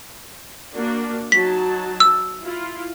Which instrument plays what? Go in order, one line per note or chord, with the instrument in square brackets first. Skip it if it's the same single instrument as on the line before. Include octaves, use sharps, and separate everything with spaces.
[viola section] A#3 D4 F#4
[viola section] F#3 D#4 A5 [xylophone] B6
[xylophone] E6
[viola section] E4 F4